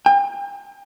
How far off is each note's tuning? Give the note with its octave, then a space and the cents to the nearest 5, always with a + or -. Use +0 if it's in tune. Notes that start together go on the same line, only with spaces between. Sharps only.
G5 +40